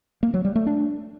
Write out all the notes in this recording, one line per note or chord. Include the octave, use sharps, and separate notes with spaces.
A#3
F#3
G3
A3
D4